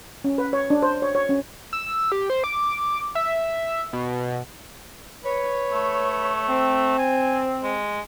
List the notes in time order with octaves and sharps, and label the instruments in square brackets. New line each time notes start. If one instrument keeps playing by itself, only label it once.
[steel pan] C#4
B4
C#5
D4
C5
C#5
C#5
C#4
[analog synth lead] E6
G4
C5
D6
E5
B2
[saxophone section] B4 C#5
[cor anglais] A3
[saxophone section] C4
[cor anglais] G#5
G#3